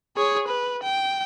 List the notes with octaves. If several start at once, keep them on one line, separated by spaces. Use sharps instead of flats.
G#4 C#5
B4
G5